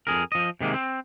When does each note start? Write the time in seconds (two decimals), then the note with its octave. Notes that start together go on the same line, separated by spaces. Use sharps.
0.07 F2 G#4 A#4
0.32 F3 D#5
0.61 C3 D#3 G#3 A#3
0.74 C4